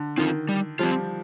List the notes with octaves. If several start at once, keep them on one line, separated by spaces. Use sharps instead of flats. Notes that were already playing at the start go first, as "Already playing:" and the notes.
Already playing: D3
D#3 C4 F4
G3
F3 G3 C4 F4